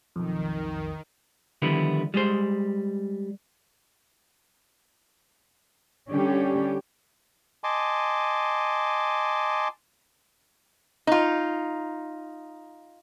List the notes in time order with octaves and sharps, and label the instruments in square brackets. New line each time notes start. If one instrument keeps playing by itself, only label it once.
[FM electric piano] B1 F2 [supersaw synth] D#3
[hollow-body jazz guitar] D3 D#3 F3 G3 B3 E4
G3 G#3 G#4 C5
[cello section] D3 G3 C#4 G4
[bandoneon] D#5 G#5 A5 C6 D6
[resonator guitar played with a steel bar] D#4 F4